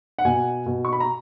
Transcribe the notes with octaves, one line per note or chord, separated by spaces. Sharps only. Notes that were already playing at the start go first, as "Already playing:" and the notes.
F#5
B2 G#5
B2
C#6
B5
A#5